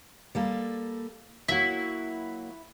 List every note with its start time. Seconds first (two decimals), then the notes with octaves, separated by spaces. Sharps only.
0.35 G3 A#3 A4
1.48 F#3 A#3 E4 F#4